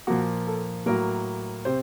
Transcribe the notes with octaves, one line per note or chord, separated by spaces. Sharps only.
A#2 F3 A#3 F#4
A4
A2 F#3 A#3 A#4
C3 C5